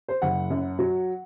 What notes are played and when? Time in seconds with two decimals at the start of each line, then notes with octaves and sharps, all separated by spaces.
0.08 C5
0.22 F#1 F#5
0.50 F#2
0.79 F#3